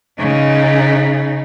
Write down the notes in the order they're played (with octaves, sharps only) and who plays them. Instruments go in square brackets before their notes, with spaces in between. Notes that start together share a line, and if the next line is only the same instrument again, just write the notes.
[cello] C#3 D#4